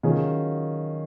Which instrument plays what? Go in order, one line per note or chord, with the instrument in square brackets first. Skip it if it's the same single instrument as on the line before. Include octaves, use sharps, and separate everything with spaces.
[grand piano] D#3 F#3 C#4 F4 G#4